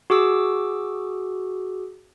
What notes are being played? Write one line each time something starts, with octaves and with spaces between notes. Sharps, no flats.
F#4 G#4 D6 E6